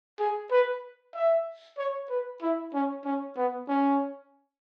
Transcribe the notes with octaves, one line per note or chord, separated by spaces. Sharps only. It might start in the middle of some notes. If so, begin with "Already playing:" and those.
G#4
B4
E5
C#5
B4
E4
C#4
C#4
B3
C#4